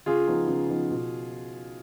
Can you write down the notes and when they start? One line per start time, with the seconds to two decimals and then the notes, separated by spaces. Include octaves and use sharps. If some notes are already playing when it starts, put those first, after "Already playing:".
0.06 C#3 F4 G#4
0.27 F3 B3 D#4
0.48 C#3
0.69 F3 B3 D#4
0.91 B2